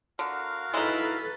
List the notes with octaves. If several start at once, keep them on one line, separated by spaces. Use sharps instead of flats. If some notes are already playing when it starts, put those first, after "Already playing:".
D3 F#4 A#4 F5
G#3 D#4 E4 A4 B4